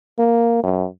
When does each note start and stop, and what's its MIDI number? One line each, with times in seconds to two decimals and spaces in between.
0.18 0.61 58
0.63 0.86 42